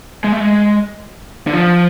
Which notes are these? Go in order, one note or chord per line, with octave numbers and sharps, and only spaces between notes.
G#3
A3
G#3
D3
F3